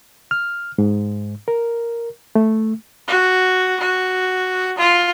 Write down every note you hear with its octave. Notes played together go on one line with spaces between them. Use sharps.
F6
G#2
A#4
A3
F#4
F#4
F4